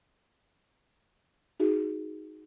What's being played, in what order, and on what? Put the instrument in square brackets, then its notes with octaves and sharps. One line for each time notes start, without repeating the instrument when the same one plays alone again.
[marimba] D#4 F#4 G#4